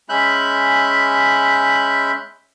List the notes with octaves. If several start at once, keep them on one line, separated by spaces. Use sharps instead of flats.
G#3 C#4 E5 B5 F#6 G6